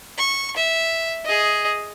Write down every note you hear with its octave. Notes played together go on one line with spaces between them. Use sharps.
C#6
E5
G#4 D#5